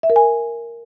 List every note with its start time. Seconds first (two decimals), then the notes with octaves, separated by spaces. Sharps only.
0.03 E5
0.10 A#4
0.16 G#5